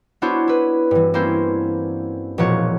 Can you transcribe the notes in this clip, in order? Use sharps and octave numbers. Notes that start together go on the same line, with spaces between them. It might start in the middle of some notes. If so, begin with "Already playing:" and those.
B3 D4 E4 F#4 C5 C#5
E4 B4
G2 E3
A#3 C4 C#4 E4 C5
E1 A#2 F3 F#4 C#5